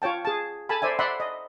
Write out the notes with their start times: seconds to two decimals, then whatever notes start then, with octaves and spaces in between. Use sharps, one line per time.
0.02 F4 C#5 G5 A5
0.25 G#4 A5
0.69 A4 G#5 A5 B5
0.82 C5 D5 E5 G#5
0.99 D5 E5 F#5 B5 C6
1.20 D#5